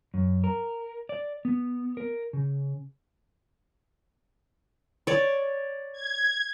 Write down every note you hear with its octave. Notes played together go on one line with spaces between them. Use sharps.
F#2
A#4
D5
B3
A#4
C#3
C#5 D5
G#6